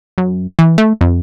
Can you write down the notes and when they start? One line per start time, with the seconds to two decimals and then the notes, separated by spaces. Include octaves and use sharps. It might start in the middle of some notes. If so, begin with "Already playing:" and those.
0.18 F#2
0.59 E3
0.78 A3
1.01 F2